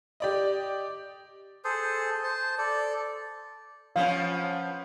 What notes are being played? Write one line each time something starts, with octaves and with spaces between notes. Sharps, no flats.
G4 D5 D#5
G#4 A4 C5
C5 A5
A4 D5
F3 B3 C#4 F5